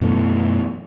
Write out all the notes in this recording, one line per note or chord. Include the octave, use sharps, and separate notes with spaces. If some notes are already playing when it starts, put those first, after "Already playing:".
F#2 B2 E3 A3